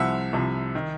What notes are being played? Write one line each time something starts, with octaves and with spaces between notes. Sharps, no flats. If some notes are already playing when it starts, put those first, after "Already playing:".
Already playing: C2 C3 F3 E5 F#5
C2 C3 F3
D#3